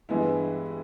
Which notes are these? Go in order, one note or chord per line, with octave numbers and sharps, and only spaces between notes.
G2 E3 G#3 B3 E4